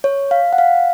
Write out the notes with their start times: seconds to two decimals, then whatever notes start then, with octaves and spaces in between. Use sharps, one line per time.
0.04 C#5
0.31 F5
0.53 F#5
0.58 F5